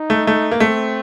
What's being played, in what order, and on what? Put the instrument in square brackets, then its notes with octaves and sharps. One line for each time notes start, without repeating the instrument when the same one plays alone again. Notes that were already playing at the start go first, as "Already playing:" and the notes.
Already playing: [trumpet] D#4
[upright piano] A3
A3
A#3
[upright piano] A3 [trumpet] C4